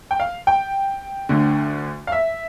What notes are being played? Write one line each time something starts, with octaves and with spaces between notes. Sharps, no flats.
G5
F5
G5
D2 D3
F5
E5